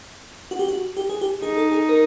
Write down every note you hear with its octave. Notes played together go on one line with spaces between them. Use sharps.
F#4
G4
F#4
G4
G#4
G4
D#4 G#4
A4
G#4
A#4